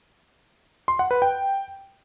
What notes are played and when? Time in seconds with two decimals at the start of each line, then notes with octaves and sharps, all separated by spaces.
0.88 C6
0.99 F#5
1.11 B4
1.22 G5